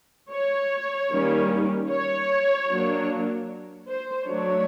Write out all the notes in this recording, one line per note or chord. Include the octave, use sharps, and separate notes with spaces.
C#5
D#3 G3 A#3 C#4
C#5
F#3 A#3 D4
C5
F#3 A3 D4 C#5